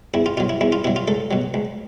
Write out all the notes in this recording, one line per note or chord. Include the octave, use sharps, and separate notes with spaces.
E2 E4
F4
B2 F#3 F4
E4
E2 E4
F4
B2 F#3 E4
F4
C#2 A4
B2 F#3
C#2